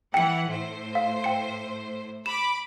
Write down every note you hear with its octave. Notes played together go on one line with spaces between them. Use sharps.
E3 F#5 G5 C#7
A2 C5
F5
G5 C#7
B5 D6 E7